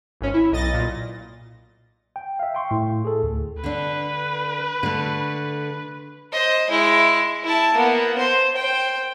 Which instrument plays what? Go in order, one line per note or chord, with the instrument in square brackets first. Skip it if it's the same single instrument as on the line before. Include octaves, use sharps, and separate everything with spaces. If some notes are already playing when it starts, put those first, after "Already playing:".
[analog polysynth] G#1 C#4
E4
B1 D#5 A6 A#6
A#2
[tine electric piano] G5
E5 F5
G5 C6 C#6
A2
G#4 A4
D2
[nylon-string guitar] D3 D4 [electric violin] B4
[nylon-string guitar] D3 A3
[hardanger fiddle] C5 D#5
G#3 E4
E4 A5
A#3 B3
C5
C5 G5